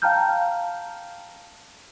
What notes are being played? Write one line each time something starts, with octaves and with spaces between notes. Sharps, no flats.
F5 G5 A5 A#5 F6 G6